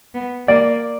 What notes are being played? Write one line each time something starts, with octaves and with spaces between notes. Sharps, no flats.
B3
A#3 D5